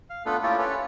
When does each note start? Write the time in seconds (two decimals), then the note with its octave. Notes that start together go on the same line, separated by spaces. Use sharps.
0.10 F5
0.26 A3 B3 D4 F4 A4 B4
0.43 A#3 C#4 E4 F4 G4 D5
0.58 C#4 F4 A4 B4 C#5